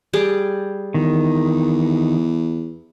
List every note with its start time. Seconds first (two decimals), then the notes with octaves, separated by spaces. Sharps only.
0.13 G3 G#4 D6
0.94 E2 D#3